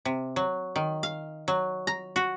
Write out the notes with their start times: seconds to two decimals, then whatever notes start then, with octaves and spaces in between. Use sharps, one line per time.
0.05 C3
0.36 F#3
0.76 D#3
1.03 F5
1.48 F#3
1.87 A#5
2.16 F#4